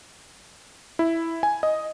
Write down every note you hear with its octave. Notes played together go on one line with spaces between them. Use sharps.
E4
G#5
D#5